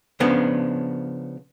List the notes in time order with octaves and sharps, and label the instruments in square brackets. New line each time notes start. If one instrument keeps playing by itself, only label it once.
[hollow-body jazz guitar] C#3 F3 B3 D4